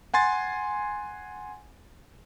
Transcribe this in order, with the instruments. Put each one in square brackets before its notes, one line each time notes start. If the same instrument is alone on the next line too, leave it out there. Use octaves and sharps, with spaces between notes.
[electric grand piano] F#5 G#5 C6 A6